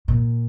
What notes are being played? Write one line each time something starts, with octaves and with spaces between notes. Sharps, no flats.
A#2